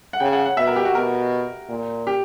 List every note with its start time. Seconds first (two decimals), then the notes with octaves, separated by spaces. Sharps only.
0.13 F#5
0.20 C#3 G5
0.33 F#5
0.46 F#5
0.57 B2 E5
0.67 A#4
0.76 G4
0.85 F#4
0.95 B2 A#4
1.69 A#2
2.07 G4